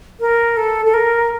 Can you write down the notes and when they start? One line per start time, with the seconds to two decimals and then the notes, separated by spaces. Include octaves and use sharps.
0.20 A#4
0.57 A4
0.85 A4
0.94 A#4